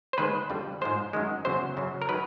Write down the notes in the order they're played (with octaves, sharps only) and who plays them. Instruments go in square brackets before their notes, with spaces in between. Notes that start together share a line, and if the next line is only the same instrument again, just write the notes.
[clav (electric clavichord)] C5
D#2 D#3 G#3 B4
F2 D3 G3
G#2 F3 G#3 C5
F#2 D#3 G#3
E2 C#3 F#3 C5
F#2 C#3 F#3
A#4
D#3 F#3 B4